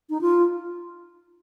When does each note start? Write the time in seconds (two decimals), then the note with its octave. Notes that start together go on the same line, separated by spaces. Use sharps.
0.10 D#4
0.21 F4